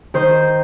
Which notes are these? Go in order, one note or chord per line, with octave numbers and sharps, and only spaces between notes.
D#3 C5